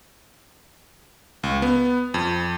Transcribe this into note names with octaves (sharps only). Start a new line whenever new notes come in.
C#2
B3
F2